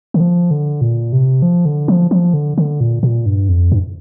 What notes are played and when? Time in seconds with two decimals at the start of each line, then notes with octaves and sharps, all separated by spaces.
0.14 D3
0.20 F3
0.51 D3
0.81 A#2
1.12 C3
1.42 F3
1.65 D3
1.88 F3
2.11 F3
2.34 D3
2.58 D3
2.81 A#2
3.03 A#2
3.26 G2
3.49 F2
3.72 G2